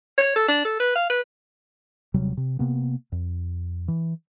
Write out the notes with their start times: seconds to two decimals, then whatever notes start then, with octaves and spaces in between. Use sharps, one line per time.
0.18 C#5
0.36 A4
0.48 D4
0.65 A4
0.80 B4
0.96 F5
1.10 B4
2.14 D#1 C3 F#3 G3
2.37 C3
2.59 C3 A#3 B3
3.12 F2
3.88 E3